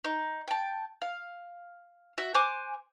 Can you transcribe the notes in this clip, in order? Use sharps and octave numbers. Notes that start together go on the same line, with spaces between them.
D#4
G5 A5
F5
F#4 E5
C5 G#5 D6 F#6